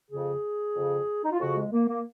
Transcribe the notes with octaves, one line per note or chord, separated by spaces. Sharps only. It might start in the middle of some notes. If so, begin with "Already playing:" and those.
F2 C#3 G#4
F2 C#3
D#4
F4
F2 C#3 F#4
G#3
A#3
A#3